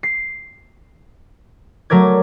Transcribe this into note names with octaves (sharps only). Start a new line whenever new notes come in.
C7
F#3 A3 A#4 D5 G#6